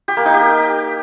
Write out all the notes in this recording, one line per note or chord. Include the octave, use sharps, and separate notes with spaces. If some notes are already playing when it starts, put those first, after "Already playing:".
G4
A#3
D#4
G4